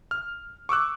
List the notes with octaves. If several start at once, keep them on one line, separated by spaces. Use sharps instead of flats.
F6
C#6 D6 E6 F#6